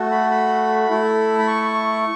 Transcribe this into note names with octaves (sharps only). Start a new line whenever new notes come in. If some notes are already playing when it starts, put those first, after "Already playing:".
Already playing: A3 F#4 A4
B5
B5
A3 E4 A4
B5
C#6